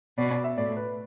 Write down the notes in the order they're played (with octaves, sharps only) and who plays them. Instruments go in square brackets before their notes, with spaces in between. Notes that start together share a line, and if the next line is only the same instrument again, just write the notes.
[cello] B2 [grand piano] D5
[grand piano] D5
E5
[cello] A2 [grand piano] D5
[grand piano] B4